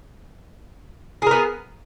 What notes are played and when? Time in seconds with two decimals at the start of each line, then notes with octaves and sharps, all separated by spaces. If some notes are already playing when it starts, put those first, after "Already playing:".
1.22 G#4
1.27 A#4
1.31 B3